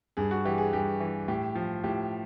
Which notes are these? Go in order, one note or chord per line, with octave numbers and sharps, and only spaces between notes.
G2 G#4
F#4
E3 G4
G#4
G2 G4
E3
A2 G4
F3
A2 G4